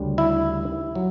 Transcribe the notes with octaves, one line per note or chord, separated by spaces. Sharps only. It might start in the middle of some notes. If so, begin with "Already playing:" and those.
Already playing: D2 C#3 G3
E4
F#3